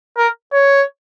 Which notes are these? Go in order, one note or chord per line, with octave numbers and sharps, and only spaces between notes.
A#4
C#5